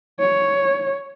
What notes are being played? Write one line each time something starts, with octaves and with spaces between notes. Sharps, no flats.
C#5